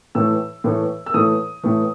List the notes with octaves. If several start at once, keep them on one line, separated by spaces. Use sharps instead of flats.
A2 E3 A3 E6
A2 E3 A3
E6
A2 E3 A3 D#6
A2 E3 A3